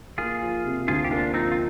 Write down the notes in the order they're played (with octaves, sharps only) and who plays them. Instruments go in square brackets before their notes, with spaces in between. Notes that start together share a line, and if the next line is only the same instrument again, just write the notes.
[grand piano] A#3 [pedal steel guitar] F4 G#4
[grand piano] F3
C3
[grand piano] D2 [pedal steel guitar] F4 G#4
[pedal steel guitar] G4
[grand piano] A#3 [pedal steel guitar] D4 F4
[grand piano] F3 [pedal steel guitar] C4 D#4
[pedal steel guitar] F4